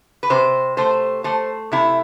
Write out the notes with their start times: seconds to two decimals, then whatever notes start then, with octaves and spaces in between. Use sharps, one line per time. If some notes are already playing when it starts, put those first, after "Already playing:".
0.23 B4
0.30 C3 C5
0.77 A3 C5
1.24 A3 C5
1.72 C3 E4